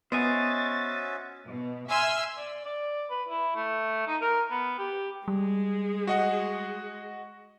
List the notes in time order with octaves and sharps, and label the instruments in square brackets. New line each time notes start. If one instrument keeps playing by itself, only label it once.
[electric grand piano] B3 [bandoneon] C#4 F#4 E5 [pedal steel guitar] C5 D#5 G#5 [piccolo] A6
[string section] B2
E5 G#5 C6 E6 F6
[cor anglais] D5
D5
B4
E4
A3
D#4
A#4
B3
G4
[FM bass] G3 [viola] G#3 G#4
[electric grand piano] F#4 D#5 F#5